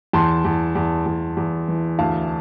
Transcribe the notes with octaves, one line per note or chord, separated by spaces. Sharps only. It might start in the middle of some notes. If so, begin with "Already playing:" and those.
E2 A5 C6
E2
E2
E2
E2
E3
D2 F5 A5